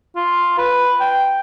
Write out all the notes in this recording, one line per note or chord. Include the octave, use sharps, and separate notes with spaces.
F4
B4
G5